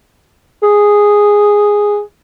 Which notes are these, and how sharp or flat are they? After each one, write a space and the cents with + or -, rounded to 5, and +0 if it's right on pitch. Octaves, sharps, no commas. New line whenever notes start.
G#4 -5